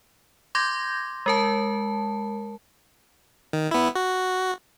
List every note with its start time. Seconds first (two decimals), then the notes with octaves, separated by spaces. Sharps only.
0.55 C6 D6 G6 G#6 A#6
1.26 G#3 A#4 A5
3.53 D#3
3.71 B3 E4
3.95 F#4